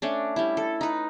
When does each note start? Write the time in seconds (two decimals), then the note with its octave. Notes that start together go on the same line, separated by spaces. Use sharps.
0.02 A3 C#4 D4
0.36 G3 E4
0.57 A4
0.81 D#4 B4